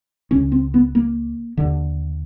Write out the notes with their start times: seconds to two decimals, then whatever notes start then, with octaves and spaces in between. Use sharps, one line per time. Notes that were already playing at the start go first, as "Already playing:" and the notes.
0.31 C#2 C#3 C#4
0.52 C4
0.74 B3
0.95 A#3
1.57 D#2 D3